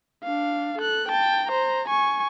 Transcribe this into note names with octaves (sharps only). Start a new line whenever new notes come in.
D4 F5
A4 F#6
G5 A5
C5 A#5
G#5 C#6